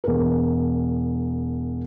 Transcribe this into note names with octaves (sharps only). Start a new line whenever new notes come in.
E1 A#4